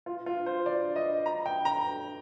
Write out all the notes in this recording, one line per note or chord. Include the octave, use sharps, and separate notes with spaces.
F4
F4
C5
D5
D#5
A#5
G5
A#5